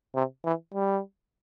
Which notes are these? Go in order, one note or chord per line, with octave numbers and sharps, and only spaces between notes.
C3
E3
G3